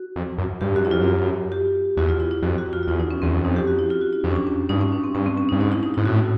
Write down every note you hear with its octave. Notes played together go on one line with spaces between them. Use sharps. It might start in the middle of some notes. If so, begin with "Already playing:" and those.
Already playing: F#4
F2
F#2
G2 G4
F#2 F#4
E4
F2 F4
F#2
G4
E2 F#4
F4
E4
E4
F2 F#4
F#4
F4
F4
E2 E4
D#4
C#4
E2 C4
F2
D#4
G4
F#4
E4
F4
F#4
E4
F2 D4
C#4
D4
C#4
G2 D#4
C#4
D4
C4
G2 C#4
C4
C#4
D#4
G2
G#2 D#4
E4
D#4
G#2 E4
A2 F#4